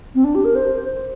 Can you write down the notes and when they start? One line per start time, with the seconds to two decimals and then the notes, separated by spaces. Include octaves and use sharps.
0.15 C4
0.24 D4
0.35 G4
0.45 A#4
0.55 C5